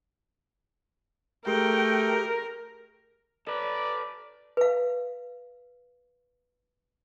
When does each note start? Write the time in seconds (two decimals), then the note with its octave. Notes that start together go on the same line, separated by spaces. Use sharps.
1.47 A3 G4 G#4 A#4 G5
3.47 A4 B4 D5
4.57 B4 F5